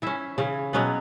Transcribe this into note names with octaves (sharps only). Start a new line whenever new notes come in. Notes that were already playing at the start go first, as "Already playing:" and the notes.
E3 C#4 E4 E5
C#3 E3 C#4
B2 F#3 B3 C#4 B4